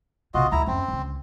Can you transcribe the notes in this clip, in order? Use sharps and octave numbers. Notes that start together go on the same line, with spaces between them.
B1 C3 F4 F#4 D#5
D2 E4 A#5
F#2 C4 C#4
C#2 D3